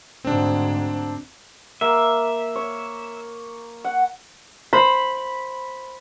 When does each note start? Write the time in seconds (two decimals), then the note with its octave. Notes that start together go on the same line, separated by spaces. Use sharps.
0.24 D2 G#2 C4 D4
1.81 A#3 E5
2.56 C#5
3.85 F#5
4.73 C5 B5